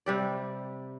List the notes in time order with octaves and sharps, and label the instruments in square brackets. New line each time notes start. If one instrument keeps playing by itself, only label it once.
[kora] C3 G3 D5